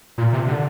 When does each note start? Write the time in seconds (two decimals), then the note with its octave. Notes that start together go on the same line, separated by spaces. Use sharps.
0.18 A#2
0.33 C3
0.48 D3